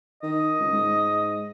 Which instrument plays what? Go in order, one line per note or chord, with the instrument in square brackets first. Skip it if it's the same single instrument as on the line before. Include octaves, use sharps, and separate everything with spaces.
[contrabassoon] D#3 [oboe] D#5
[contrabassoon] C#2
G#2